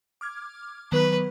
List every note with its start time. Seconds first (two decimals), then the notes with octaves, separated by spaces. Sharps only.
0.21 D6 F6 G#6
0.92 D#3 F#3 B3 B4